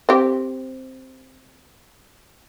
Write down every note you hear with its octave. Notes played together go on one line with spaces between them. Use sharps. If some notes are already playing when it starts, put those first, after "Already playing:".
C4 G4